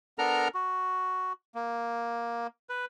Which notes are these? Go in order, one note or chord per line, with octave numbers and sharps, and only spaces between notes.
B3 D4 A4 A#4 A#5 F6
F#4
A#3
B4